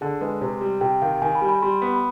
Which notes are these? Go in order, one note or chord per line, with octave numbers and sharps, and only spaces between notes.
D3 G#4
G#3 B4
C3 C5
G3
C3 G5
D#3 F5
D#3 G#5
B5
G3
B5
G3 C6
B3 B5
B5